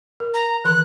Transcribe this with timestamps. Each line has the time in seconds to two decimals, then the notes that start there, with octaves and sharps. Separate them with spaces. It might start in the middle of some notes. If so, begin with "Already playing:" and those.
0.20 A#4
0.34 A#5
0.64 D#3 E3 C6 F#6